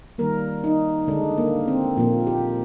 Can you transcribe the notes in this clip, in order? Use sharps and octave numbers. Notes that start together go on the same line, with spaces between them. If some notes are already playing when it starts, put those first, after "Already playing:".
D#3 G3 A#3 A#4
D#4
D3 G#3 D4
A#3
C4
A#2 F3 A#3
G4